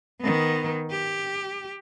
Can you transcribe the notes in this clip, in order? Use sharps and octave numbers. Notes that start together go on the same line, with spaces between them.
D#3 B3
G4